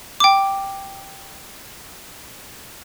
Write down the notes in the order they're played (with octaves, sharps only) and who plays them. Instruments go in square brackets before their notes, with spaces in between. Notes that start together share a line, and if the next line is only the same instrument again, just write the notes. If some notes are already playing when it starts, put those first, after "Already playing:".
[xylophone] G5 D6